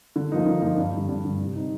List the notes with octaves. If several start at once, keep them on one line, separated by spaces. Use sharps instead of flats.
D3
F3 A#3 D#4
D3
F3 A#3 D#4
G2
D3 G3
G2
D3 G3
C3
G3 C4 D#4